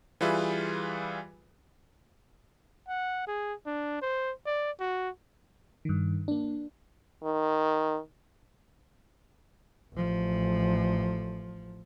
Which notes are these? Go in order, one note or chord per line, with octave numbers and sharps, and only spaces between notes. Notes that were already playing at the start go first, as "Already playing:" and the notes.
E3 G3 F4 G#4 B4 E5
F#5
G#4
D4
C5
D5
F#4
G2 D#3
A#3 D4
D#3
A1 F3